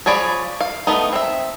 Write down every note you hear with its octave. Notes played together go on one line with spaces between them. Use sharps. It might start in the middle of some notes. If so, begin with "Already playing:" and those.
F3 G#4 C#5 D5 B5
F5
A3 B3 D#4
C4 E5